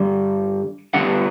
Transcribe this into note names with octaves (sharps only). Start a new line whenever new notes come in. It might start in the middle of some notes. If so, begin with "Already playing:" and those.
Already playing: G2 D3 G3
D2 D3 G3 B3 D4 F#5